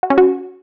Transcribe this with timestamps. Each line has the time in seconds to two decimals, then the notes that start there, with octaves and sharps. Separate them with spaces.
0.03 F#4
0.10 C#4
0.18 F#4